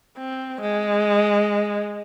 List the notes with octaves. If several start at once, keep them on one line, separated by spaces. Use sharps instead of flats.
C4
G#3